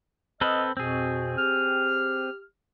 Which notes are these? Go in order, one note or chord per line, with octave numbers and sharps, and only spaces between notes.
C4 A4 B4 D#5 F6
F2 B2 C4 G#4
G4 F6